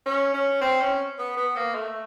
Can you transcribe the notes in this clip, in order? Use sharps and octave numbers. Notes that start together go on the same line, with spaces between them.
C#4
C#4
C4
C#4
B3
B3
A#3
A3